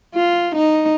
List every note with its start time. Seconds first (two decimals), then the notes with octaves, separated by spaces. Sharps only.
0.14 F4
0.55 D#4